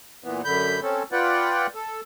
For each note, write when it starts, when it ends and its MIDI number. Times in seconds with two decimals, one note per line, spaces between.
0.24 0.42 46
0.24 0.42 52
0.24 0.42 59
0.45 0.80 42
0.45 0.80 50
0.45 0.80 83
0.45 0.80 91
0.83 1.03 60
0.83 1.03 61
0.83 1.03 69
1.12 1.67 65
1.12 1.67 71
1.12 1.67 74
1.12 1.67 78
1.12 1.67 79
1.75 2.01 69